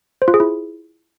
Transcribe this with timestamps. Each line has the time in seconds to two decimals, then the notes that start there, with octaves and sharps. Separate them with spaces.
0.22 C5
0.28 F4
0.34 G#4
0.40 E4